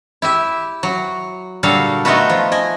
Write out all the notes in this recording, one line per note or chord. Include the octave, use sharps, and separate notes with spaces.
E4 G4 E5
F#3
A#2 D3 F#3 G3 A4 F5
A3 B3 D#4 F4 F#4 B4
F3
D#5 G#5